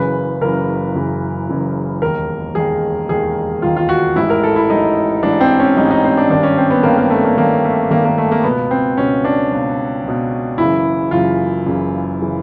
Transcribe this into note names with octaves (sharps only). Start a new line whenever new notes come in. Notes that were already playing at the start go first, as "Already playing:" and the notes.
Already playing: F#1 F#2 C#3 E3 B4
F#1 F#2 C#3 E3 A#4
F#1 F#2 C#3 E3
F#1 F#2 C#3 E3
E1 D#2 D#3 A#4
E1 D#2 D#3 G#4
E1 D#2 D#3 G#4
E1 D#2 D#3 F4
F4
F#4
A1 G#2 E3 E4
A#4
A4
E4
A1 G#2 E3 D#4
A1 G#2 E3 D4
C4
C#4
A1 G#2 E3 D#4
D#4
C4
D4
G#1 G2 D#3 D4
C#4
C4
B3
G#1 G2 D#3 A#3
A#3
A3
A#3
G#1 G2 D#3 A#3
A3
G#1 G2 D#3 A#3
A#3
A3
A#3
C#2 B2 B3
C4
C#2 B2 C#4
D4
C#2 B2
C#2 B2
F#1 F#2 C#3 E3 E4
F#1 F#2 C#3 E3 F4
F#1 F#2 C#3 E3
C#3 E3